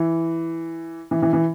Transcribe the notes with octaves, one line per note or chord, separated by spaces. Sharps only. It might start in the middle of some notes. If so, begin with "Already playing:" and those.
Already playing: E3
E3
E3
E3